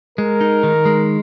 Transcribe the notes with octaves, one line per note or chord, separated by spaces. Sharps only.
G#3 A#4
D#4
D#3
G#3